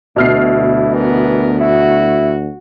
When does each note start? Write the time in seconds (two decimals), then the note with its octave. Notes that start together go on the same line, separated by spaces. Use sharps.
0.16 D2 B2 E4 F6 C7
0.94 E3 B3 A#4
1.61 E4 F#4